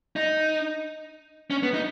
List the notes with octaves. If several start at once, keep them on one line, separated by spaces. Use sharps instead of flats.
D#4
C#4
B3
D#4